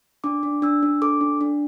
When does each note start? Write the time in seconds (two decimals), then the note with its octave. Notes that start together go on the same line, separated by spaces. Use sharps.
0.24 D4 D6
0.43 D4
0.62 D4 E6
0.83 D4
1.02 A4 D6
1.21 D4
1.41 D4